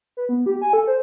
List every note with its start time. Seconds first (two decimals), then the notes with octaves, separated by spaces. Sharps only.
0.17 B4
0.29 B3
0.46 G4
0.62 G#5
0.73 A4
0.87 C5